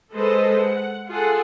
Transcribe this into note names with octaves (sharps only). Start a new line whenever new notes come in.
G#3 A4 B4 C5 D#5
F#5
F4 G#4 A4 F#5